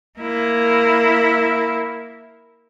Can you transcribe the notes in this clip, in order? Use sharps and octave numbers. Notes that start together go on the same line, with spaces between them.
A#3 E4